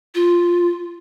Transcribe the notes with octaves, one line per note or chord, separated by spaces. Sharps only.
F4